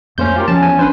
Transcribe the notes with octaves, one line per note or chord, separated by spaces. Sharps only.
F2 A3 A#3 C#4 C5 G6
F4 G4 A#4
F3 C#4 A5
E2 G#5
G#1 D4 B4 C5